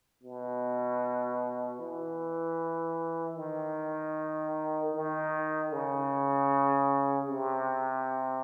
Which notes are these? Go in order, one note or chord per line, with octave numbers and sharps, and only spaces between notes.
B2
E3
D#3
D#3
C#3
C3